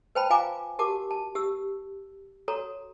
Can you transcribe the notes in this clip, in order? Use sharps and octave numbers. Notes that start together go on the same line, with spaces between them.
B4 C5 G5 A5 B5
F4 F5 G#5 A#5 D6
F#4 G4 A#4 A5 D6
A5
G4 E6
F#4 A4 C#5 A#5